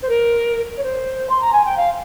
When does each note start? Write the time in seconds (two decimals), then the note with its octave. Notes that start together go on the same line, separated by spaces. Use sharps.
0.02 C5
0.08 A#4
0.76 C#5
0.83 C5
1.29 C6
1.40 A#5
1.52 G#5
1.64 G5
1.76 F5